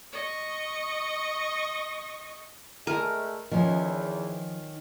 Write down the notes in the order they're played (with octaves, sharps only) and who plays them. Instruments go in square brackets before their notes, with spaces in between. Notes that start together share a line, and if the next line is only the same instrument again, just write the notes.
[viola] D#5 C#6
[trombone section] A#2 G#3 A3 [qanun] A#4
[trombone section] E2 [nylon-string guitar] D#3 C#4 [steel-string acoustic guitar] F3